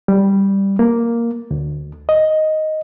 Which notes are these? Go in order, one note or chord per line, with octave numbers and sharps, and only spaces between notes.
G3
A#3
D2
D#5